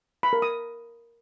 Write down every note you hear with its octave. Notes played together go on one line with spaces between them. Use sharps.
B5
A#4
D#6